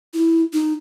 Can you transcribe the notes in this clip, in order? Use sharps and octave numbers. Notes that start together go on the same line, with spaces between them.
E4
D#4